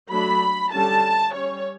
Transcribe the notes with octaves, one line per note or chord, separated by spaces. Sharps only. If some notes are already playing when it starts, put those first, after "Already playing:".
F#3 A3 D4 B5
D3 G3 C#4 A5
G3 C#4 C#5